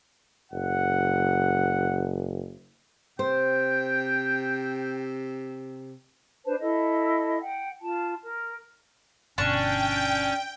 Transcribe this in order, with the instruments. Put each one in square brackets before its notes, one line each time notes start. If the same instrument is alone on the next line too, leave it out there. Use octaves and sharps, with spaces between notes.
[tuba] F#1 [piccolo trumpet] F#5
[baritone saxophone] C3 [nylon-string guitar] C5 [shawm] G5
[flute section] D4 B4 C5 A5
E4 A4 D#5
F#5 G5
F4 A5
A#4
[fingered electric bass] G1 B2 [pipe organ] C#4 [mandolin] D4 C#6 [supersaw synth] G5